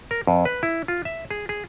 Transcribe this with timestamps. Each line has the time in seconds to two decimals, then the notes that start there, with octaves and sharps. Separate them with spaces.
0.11 A#4
0.27 F2
0.45 B4
0.63 E4
0.88 F4
1.05 E5
1.31 G#4
1.49 G#4